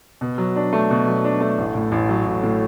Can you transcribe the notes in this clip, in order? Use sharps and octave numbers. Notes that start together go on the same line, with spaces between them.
B2
F#3
D4
A3
B2
F#3
D4
A3
A1
A2
A1
F#3
A1
A2